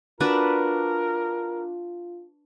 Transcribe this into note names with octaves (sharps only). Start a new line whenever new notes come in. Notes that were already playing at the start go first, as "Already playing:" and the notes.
D4 F4 F#4 A#4 B4